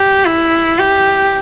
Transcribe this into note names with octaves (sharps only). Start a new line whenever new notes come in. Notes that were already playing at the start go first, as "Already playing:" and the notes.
Already playing: G4
E4
G4